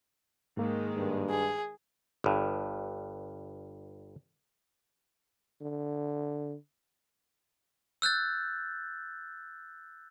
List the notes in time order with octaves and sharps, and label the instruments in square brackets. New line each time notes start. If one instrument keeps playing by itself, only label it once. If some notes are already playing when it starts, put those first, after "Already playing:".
[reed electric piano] G#2 A#3 [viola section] D#3 G#3
[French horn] G2
[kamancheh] G#4
[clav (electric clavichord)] G1 G2
[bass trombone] D3
[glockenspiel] E6 F#6 G6 A6